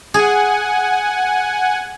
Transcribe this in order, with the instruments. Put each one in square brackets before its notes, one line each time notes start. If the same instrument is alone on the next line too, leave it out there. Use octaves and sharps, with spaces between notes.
[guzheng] G#4 [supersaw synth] F#5 G#5